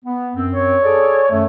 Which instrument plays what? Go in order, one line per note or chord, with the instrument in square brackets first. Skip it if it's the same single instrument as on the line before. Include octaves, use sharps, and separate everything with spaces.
[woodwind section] B3
F#2 C4
[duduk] C#5
[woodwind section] G#4 A4 D5
[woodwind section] F#2 D#3 [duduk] A3